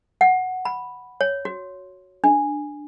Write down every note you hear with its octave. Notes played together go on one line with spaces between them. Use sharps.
F#5
B5
C#5
F#4
D4